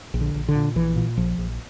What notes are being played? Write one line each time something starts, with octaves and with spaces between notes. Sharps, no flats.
A#1
D3
A#1
D3
A#2
A#1 E3
A#2
A#1 F3
A#1